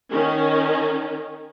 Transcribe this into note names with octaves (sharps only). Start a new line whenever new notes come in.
D#3 C#4